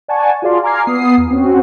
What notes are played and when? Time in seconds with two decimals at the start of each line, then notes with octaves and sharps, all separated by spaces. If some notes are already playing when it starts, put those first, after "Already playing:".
0.08 D5 F#5 G#5 A5 C#6
0.42 F4 F#4 G#4 D5 F5 C6
0.63 G#5 A#5 D6 F6 G#6 C7
0.87 B3 D#6 C7
1.17 E2
1.31 C4 C#4 F#4